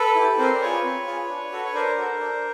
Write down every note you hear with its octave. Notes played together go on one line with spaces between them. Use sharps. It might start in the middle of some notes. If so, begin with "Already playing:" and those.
Already playing: A4 B4
E4 G4
C4 A#4 C5
D5
F4 G#4 B4 C#5
C4
F4 G#4
D4
F#4 A4
C#5
D4 A#4 C5
F#4 A4
D4